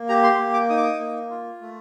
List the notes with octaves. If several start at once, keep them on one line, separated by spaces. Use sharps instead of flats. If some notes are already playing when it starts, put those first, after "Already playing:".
Already playing: A#3
G4 A#5
C6
A#3
D6
D#4 D#6
D6
D#6
A#3
F4
A3